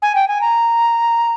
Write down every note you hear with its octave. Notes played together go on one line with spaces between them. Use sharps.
G#5
G5
G#5
A#5